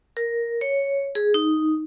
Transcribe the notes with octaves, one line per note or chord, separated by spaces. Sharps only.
A#4
C#5
G#4
D#4